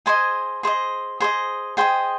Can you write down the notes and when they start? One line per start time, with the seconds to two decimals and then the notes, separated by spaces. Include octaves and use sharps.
0.06 G#4 C5 D#5 G#5
0.63 G#4 C5 D#5
1.20 G#4 C5 D#5
1.77 G#4 C5 D#5 G5